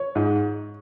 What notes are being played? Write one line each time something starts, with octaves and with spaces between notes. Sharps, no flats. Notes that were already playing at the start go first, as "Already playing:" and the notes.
Already playing: C#5
G#2